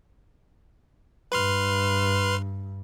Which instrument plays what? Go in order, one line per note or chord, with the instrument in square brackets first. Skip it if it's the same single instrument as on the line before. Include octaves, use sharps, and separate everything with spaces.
[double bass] G2 [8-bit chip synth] B4 C6 F6